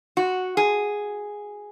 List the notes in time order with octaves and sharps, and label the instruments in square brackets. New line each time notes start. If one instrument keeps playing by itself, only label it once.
[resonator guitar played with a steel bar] F#4
G#4